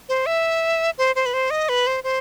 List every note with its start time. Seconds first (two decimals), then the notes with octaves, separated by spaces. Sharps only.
0.09 C5
0.26 E5
0.98 C5
1.16 C5
1.26 B4
1.34 C5
1.50 D#5
1.69 B4
1.87 C5
2.04 C5